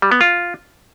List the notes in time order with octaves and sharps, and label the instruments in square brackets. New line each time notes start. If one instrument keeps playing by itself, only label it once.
[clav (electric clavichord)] G3
B3
F4